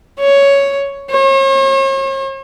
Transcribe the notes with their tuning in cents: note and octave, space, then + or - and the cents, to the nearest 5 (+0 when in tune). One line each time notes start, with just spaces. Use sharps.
C#5 +5
C#5 -45